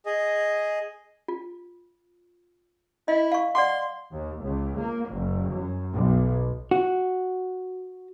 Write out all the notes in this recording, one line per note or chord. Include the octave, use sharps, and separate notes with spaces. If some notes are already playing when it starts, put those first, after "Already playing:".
G#4 D#5
F4
E4 D#5
F5 C#6
D5 F#5 C6 D6
D#2
C#2
A#3
F#1
F#2
B1
F#4